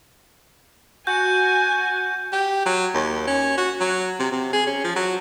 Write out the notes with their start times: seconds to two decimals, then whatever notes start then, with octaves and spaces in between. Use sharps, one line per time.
1.07 F#4 G#5 G6
2.32 G4
2.66 F#3
2.94 D#2
3.27 C#4
3.58 F#4
3.80 F#3
4.20 C3
4.32 C3
4.53 G#4
4.67 C#4
4.84 F3
4.96 F#3